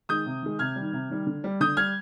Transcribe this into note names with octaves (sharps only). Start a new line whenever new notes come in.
D#3 G#3 D#6 G6
C3
D#3 G#3
C3 F6 G#6
D#3 G3
C3
D#3 G3
D3
G3
D3 D#6 G6
G3 F6 G#6